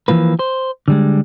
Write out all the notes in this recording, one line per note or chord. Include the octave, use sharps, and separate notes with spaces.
E3 F3 A#3 B4
C5
D3 G3 G#3